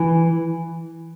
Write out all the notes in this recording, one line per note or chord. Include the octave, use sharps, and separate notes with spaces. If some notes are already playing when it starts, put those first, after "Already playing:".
Already playing: E3